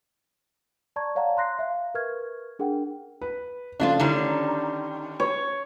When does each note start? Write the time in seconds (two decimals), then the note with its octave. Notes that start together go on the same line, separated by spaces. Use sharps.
0.96 D5 A5 A#5 C#6 G#6
1.15 C#5 D5 F5 F#5 A5 A#5
1.36 A#5 C6 F#6 A#6 C7
1.59 E5 F5
1.95 A#4 B4 C#6 F6 G#6
2.59 D4 G#4 A#4 F#5 G5
3.21 B4
3.80 C#3 F3 A3 D4 E4 F4
4.00 D3 D#3 G3 C#4 E4
5.20 C#5